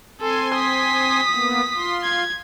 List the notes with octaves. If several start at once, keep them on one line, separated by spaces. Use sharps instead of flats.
C4 A4 G#5 C6
D#6 B6
A#3 B3
F4 C6
G#6